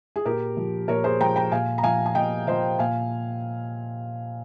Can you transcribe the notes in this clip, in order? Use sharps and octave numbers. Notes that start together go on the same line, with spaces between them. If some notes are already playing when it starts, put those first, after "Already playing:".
G#4
A#2 G4 A#4
F3
A#2 A#4 C#5
G#4 C5
F3 G5 A#5
G5 A#5
A#2 F5 G#5
A#5
F3 F5 G#5
G#5
A#2 D#5 G5
F3 C5 D#5
A#2 F5 G#5